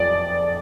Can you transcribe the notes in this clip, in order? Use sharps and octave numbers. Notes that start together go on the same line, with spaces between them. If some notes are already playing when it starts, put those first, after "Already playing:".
Already playing: F2 D5